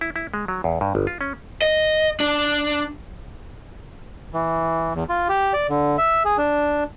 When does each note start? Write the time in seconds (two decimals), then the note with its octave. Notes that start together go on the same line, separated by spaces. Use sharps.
0.01 E4
0.16 E4
0.34 G#3
0.48 F#3
0.64 E2
0.81 G2
0.95 G1
1.07 F4
1.21 C#4
1.62 D#5
2.20 D4
4.34 E3
4.94 E2
5.09 F4
5.29 G4
5.53 D5
5.70 D3
5.98 E5
6.25 G#4
6.38 D4